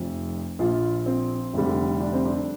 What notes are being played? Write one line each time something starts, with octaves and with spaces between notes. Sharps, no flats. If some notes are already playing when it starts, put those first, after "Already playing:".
Already playing: F1 F2 F3
A#1 A#2 F3 F4
C4
F1 F2 D3 G3
D4
C4
D4